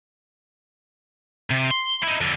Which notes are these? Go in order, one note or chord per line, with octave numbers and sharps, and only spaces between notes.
C3
C6
D#4 E4
F2 D3